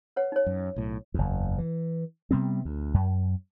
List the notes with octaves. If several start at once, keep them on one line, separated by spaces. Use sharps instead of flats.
B4 C#5 F#5
D#4 C#5
F#2
B1 A2
F#1 E2
E3
C3 G3 B3 C4
D2
F#2